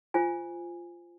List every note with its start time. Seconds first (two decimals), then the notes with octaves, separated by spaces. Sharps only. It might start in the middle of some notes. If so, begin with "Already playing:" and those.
0.14 F4 C5 G#5